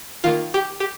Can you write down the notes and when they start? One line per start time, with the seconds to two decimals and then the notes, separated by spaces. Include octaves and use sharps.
0.24 D#3 A#3 F4
0.54 G4
0.80 G4